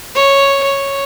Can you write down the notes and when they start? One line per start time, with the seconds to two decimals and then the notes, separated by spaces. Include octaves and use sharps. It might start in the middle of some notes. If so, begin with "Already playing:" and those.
0.16 C#5
0.64 C#5